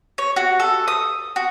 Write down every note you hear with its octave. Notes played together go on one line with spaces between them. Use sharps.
C#5
F#4
A4
D#6
F#4